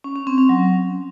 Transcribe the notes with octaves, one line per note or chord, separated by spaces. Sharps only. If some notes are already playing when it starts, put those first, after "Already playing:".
C#4
C#4
C4
C#4
F#3